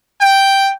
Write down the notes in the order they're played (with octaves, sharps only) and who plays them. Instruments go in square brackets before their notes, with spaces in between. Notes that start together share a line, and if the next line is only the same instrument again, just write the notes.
[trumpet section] G5